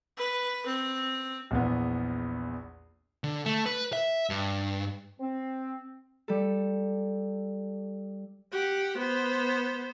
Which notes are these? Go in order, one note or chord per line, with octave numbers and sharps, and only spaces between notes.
B4
C4
A#1 E2 B3
D3
A3
B4
E5
G2
C4
G3 A4
G4 F#5
B3 C5